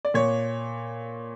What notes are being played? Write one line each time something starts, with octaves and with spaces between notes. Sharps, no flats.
D5
A#2 C#5